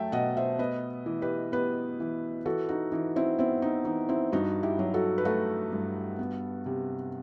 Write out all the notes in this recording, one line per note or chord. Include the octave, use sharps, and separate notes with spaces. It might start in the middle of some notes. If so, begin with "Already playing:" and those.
Already playing: F#3 A3 E5 G5 A5
B2 D#5 F#5
C5 E5
B3 B4 D#5
E3
G4 B4
B3 G4 B4
E3
E3 F#4 A4
D#4 F#4
E3 D#4
C4 E4
B3 C4 E4
D#4
E3 D#4
C4 E4
G2 D#4 F#4
E4 G4
F#3
F#4 A4
B4
A3 F#4 A4
G2
B3
C3